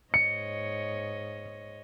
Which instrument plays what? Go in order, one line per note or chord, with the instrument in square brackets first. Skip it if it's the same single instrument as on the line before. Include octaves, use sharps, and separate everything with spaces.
[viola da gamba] G#2 C#5 D#5 [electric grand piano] C#7